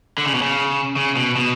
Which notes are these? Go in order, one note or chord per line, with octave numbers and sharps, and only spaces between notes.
D3
C#3
B2
C#3
C#3
B2
B2